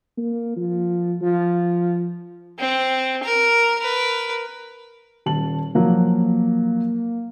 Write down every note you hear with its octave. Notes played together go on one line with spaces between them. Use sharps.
A#3
F3
F3
C4
A#4
A#4 B4
D#1 A5 F#7
F3 F#3 A#3